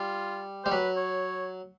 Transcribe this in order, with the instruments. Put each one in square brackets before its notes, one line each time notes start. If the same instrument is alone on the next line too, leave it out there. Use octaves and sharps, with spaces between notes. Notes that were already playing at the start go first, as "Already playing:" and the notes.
Already playing: [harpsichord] G3 [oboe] F4
[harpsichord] G3 [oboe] C5
[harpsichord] F#3 [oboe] B4
[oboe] C#5